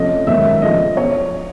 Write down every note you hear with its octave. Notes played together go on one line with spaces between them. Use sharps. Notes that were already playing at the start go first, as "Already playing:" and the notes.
Already playing: C3 F3 A3 C#4 D#5
G#2 D#3 F#3 A#3 C#4 E5
C#3 F3 A3 D4 D#5
B2 C#5